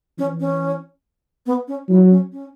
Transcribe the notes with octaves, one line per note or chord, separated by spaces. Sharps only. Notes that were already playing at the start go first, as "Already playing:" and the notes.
E3 C#4
C#4
B3
C#4
F#3 E4
C#4
C#4